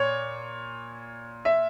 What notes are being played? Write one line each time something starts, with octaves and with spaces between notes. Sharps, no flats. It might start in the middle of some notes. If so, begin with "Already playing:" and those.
Already playing: A#2 C#5
E5